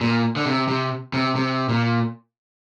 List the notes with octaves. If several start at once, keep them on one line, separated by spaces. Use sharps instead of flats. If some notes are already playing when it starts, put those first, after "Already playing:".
A#2
D3
C3
C3
C3
C3
A#2